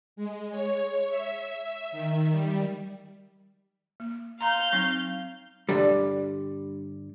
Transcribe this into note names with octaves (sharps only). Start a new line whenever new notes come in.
G#3
C#5
E5
D#3
G3
A#3
F5 A#5 C6 G6
F#3 C4 D#4
G2 D3 G3